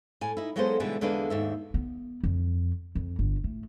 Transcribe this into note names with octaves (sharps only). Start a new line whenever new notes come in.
A2 G#5
D#4 E4
F#3 G#3 A#3 B3 A4 C5
B2 D3 E3 G3 G#3 B3
E2 D3 G#3 A#3 D4 B4
D#2 G#2 E5
B3
F2
F2
G1
A2